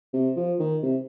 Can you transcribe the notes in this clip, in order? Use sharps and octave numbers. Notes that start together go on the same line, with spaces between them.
C3
F3
D#3
C3